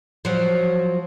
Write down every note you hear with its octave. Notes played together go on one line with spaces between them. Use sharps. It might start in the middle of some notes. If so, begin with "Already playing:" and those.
F3 F#3